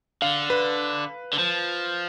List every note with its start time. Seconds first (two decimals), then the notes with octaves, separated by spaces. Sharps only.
0.22 D3 F5
0.50 B4
1.33 D3
1.38 F3